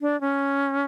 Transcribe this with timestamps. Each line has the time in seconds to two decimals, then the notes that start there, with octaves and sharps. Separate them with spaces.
0.01 D4
0.21 C#4